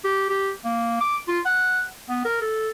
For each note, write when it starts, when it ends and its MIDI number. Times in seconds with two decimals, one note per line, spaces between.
0.04 0.26 67
0.30 0.52 67
0.65 0.98 58
1.01 1.17 86
1.28 1.39 65
1.45 1.84 78
2.09 2.25 59
2.25 2.41 70
2.41 2.70 69